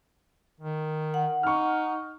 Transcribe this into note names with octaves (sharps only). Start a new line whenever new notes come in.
D#3
F#5
D#4 C#6 F6